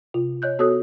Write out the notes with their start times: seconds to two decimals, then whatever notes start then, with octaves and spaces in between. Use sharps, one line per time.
0.14 C3 F4
0.42 C#5 D#5 F#6 G6
0.59 B3 F#4 A4 C#5 D#6 F#6